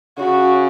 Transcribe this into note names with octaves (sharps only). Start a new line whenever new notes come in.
C#3 F#4